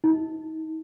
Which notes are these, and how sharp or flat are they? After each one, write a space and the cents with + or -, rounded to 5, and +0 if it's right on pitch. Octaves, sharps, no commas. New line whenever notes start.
D#4 +40